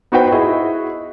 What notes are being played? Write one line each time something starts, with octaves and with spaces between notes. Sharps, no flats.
B3 D#4 F#4 B4 C5 G5
E4 F#4 G#4 D#5